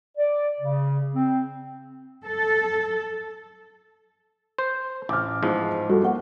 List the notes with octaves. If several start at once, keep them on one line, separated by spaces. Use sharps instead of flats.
D5
C#3
C4
A4
C5
A1 D6 F6
E2 G#2 F3
G3 F#4 A4
A#3 F#5